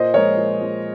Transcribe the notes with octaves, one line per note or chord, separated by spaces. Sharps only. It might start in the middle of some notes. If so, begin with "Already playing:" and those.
Already playing: A#2 C5 D#5
F3 G#3 A#4 C#5
A#2
F3 G#3